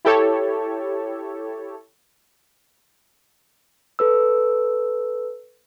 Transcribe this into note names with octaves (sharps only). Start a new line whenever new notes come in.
E4 G4 A4 C#5
A4 B4 E6